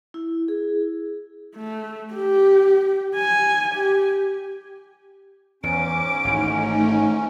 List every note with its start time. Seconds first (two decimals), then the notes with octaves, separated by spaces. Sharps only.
0.14 E4
0.48 G#4
1.56 A3
2.13 G4
3.16 G#5
3.74 G4
5.63 E2 G#2 C#4 D6 D7
6.25 G#1 E3 A3 D#4